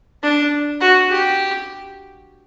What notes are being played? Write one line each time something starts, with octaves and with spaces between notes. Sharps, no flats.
D4
F#4
G4